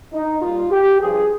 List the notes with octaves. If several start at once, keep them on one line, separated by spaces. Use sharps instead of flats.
D#4
A#2 G3 F4
G4
G2 F3 G#4